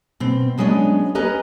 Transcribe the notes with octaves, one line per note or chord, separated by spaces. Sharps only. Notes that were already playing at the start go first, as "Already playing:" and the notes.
B2 C4
F#3 G#3 B3 C#4 D4 D#5
C#4 G4 B4 D#5 A#5